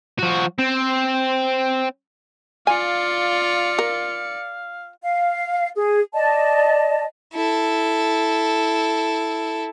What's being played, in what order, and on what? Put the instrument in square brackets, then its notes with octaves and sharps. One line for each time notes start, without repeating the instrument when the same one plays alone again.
[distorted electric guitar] F3 F#4
C4
[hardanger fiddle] F4 [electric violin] D5 C#7 [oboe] F5 [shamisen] G#5
[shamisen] A#4
[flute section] F5
G#4
D5 D#5 A5
[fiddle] E4 A4